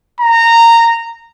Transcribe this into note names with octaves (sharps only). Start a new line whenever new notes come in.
A#5